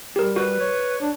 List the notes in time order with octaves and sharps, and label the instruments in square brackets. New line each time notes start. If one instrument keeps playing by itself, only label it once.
[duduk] G3 [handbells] G4 A#4
[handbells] F#4 [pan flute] B4
[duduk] C#5
D4